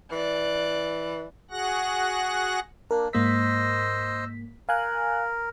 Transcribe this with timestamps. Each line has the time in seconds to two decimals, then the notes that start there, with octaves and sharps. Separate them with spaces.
0.12 E3 D5 F#6
1.51 F#4 G#4 F#5 F#6 A#6
2.91 A#3 D4 A#4
3.13 G#2 A#3 C5 D#5 E6 B6
4.69 A#4 F5 G#5 F#6